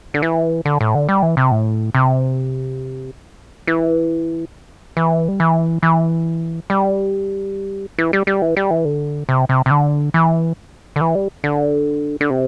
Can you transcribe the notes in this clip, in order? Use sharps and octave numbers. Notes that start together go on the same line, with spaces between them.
D3
E3
D3
A2
D3
G3
E3
C3
A2
C3
E3
E3
G3
E3
E3
G3
E3
G3
G3
E3
G3
E3
D3
C3
C3
C3
D3
E3
D3
E3
G3
D3
D3
C3